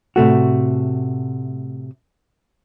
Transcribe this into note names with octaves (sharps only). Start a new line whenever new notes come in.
A2 C3 A3 F#4